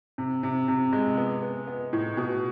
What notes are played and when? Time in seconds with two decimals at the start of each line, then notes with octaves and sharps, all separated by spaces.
0.18 C3
0.43 C3
0.68 C3
0.93 G#3
1.17 B3
1.42 B3
1.67 B3
1.93 A2
2.17 B2